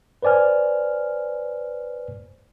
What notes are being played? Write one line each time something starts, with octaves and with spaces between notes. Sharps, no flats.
B4 C5 D5 G#5 F6